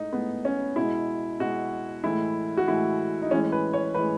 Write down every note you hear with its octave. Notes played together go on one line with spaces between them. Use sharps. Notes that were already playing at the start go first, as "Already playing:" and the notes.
Already playing: A2 G#3 D#4
A2 G#3 B3
C#4
B2 G#3 E4
B2 G#3 F#4
A2 E3 G#3 E4
F#4
A2 E3 G#3 E4
D#4
A2 E3 G#3 C#4
B4
C#5
A2 E3 G#3 B4